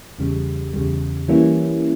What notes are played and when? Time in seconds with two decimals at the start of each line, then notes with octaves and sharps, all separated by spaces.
0.19 E2 C#3 G3
0.73 E2 C#3 G3
1.28 E3 G3 A#3 C#4 E4